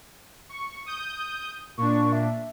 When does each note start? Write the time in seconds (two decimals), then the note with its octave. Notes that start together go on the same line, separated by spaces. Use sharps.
0.49 C#6
0.86 D#6 G6
1.77 A#2 D4 C#6
2.13 E5